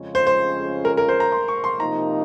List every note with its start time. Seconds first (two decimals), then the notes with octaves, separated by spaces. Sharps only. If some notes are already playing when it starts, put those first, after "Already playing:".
Already playing: F2 C#3 G#3 C#4 F4
0.15 C5
0.27 C5
0.85 A#4
0.97 A#4
1.09 C5
1.20 A#5
1.32 C6
1.48 C#6
1.64 C6
1.80 C3 F3 A#3 D#4 A#5